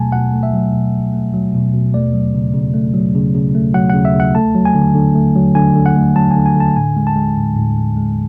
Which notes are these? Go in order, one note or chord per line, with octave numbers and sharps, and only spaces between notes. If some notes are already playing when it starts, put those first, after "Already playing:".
Already playing: B2 F#3 A3 G#5 A5
B2 F#5
A3
E5
F#3
B2
B2
A3
F#3
B2
B2
A3 D5
F#3
C#3
C#3
A3
F#3
C#3
C#3
A3
F#3 F#5
C#3 F#5
E5
C#3 F#5
A3 A5
F#3
G#5
D3
D3
A3
F#3
D3 G#5
D3
F#5
A3
F#3 A5
D3 G#5
G#5
D3 A5
A2 G#5
G#3
A5
G#3
A2
A2
G#3
G#3